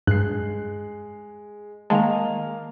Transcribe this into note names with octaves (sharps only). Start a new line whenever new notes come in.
G2 G#3 F#6 C7
D#3 G#3 A#3 F5 A5 F7